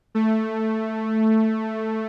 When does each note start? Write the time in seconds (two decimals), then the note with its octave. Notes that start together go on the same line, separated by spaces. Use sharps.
0.15 A3